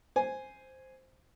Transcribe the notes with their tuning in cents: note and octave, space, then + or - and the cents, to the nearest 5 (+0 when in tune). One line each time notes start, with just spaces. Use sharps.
C5 +0 G#5 +0